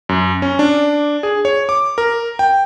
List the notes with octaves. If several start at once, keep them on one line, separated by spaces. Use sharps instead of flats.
F#2
C#4
D4
G#4
C#5
D6
A#4
G5